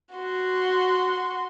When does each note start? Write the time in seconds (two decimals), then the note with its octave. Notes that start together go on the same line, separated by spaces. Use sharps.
0.13 F#4 C6